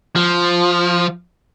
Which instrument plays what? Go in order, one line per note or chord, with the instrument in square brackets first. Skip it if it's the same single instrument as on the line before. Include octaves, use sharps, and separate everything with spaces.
[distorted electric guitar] F3